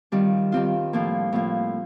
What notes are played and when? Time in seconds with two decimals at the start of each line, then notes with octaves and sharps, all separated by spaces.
0.12 D#3 G3 C4 F4
0.52 D#3 G3 C4 F4
0.93 A2 F3 A#3
1.32 A2 F3 A#3